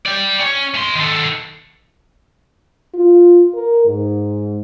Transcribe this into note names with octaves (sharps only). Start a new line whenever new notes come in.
D5 G5
C#4
A3 C6
D#3 A4
F4
A#4
G#2